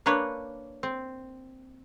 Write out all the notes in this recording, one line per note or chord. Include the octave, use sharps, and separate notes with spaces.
A#3 D4 B4 C#5
C4